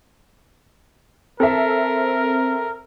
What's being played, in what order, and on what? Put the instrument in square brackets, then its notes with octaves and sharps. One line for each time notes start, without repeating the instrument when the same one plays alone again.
[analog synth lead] C4 [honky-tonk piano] A4 E5 [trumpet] A#4